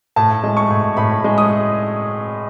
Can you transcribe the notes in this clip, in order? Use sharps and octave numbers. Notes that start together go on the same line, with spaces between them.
A2 A5
G#3
C#6
A2
A2 B5
G#3
D#6